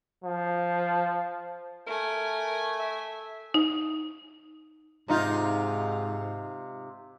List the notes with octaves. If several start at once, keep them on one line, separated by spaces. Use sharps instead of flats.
F3
A3 A#4 G#5
E5
D#4
G#2 C3 D#4 F4